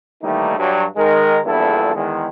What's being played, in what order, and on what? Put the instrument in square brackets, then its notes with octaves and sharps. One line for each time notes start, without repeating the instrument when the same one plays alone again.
[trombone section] D#3 E3 G3 A3 A#3 D#4
G2 F#3
D#3 G#3 A#4
A#1 E2 G2 A#2 E4 A4
E2 D#3 G#3